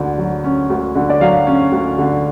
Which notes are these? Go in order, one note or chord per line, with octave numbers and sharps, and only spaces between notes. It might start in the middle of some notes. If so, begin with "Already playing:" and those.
Already playing: D2 D3
F#3
C#4
D2
D3
D5
F#3 F5
C#4
D2
D3